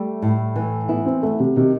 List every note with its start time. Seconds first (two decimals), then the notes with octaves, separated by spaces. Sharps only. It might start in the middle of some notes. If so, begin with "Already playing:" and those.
Already playing: G3 A3
0.22 A2
0.56 E3
0.89 B3 E4
1.06 C4
1.23 A3 B3
1.40 C3
1.56 C3 D#3